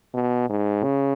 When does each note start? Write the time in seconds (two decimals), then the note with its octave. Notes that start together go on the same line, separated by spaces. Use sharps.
0.14 B2
0.49 G#2
0.83 C#3